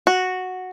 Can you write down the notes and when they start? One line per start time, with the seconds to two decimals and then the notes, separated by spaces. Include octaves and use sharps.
0.07 F#4